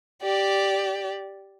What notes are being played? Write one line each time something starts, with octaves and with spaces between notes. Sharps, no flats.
G4 D5